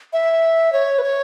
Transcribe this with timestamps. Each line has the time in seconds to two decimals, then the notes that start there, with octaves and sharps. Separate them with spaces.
0.13 E5
0.73 C#5
0.99 B4
1.03 C#5